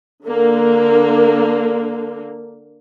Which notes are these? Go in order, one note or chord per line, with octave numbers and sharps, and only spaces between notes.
D3 A#3